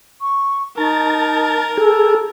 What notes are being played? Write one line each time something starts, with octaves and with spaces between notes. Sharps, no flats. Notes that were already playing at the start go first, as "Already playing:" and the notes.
C#6
D#4 A#4 A5
G#4 A4